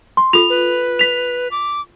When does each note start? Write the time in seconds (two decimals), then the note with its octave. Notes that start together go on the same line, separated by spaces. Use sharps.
0.17 C6
0.33 F4 A4 F7
0.50 B4
0.99 B6 F7
1.51 D6